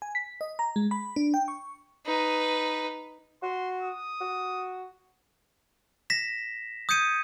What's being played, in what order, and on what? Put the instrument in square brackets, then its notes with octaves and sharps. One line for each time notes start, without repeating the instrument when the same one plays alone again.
[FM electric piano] G#5
B6
D#5
A#5
G#3
B5
D4
G5
C#6
[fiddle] D#4 B4
[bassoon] F#4 [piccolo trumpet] C6
[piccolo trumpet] D#6
[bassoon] F#4
[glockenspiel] A#6 B6 E7
D#6 G6 G#6 C#7 D#7